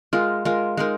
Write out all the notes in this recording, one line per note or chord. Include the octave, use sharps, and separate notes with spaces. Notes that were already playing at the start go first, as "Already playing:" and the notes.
G#3 F4 A#4
G#3 F4 A#4
G#3 D#4 A#4